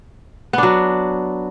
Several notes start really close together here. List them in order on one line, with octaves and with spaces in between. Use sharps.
B3 D4 F#3